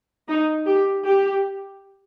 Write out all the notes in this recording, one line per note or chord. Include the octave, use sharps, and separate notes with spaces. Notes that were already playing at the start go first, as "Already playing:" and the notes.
D#4
G4
G4